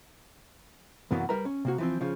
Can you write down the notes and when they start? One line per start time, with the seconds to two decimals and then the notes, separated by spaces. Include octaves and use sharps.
1.11 C2 F#2 E3 F#3 A#3 B3
1.29 G3 A#4 B4 A#5
1.45 C#4
1.65 C3 A#3 F#4
1.78 E3 F3 C4
2.01 C#3 F3